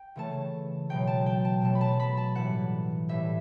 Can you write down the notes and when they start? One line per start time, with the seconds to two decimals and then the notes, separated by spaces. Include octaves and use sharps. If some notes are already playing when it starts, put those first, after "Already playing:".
Already playing: G5
0.16 C#3 E3 A3 A5
0.89 B2 F#3 A3 G5
1.07 A5
1.26 G5
1.45 A5
1.61 B2 F#3 A3 A5
1.75 B5
1.81 A5
2.00 B5
2.17 A5
2.35 A2 E3 G3 F#5
3.09 A2 E3 G3 E5